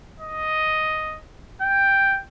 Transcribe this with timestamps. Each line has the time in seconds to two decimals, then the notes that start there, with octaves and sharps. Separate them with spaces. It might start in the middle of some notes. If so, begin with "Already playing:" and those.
0.20 D#5
1.61 G5